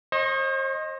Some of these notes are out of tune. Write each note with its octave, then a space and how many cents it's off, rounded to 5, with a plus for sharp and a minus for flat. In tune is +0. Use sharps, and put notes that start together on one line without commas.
C5 +40 D#5 +0 C#6 -35